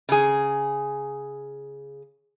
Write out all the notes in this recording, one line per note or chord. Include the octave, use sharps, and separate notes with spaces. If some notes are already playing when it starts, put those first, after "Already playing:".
C#3 G#4